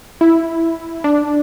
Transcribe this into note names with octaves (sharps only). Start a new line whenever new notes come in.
E4
D4